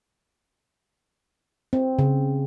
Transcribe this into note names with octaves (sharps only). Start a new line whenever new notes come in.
C4
C#3